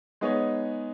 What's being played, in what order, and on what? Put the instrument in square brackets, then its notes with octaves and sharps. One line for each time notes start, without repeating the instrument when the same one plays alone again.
[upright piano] G#3 B3 D#4 G#4 C#5